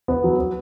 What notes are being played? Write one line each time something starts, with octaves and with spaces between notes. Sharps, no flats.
B3
F#3
B3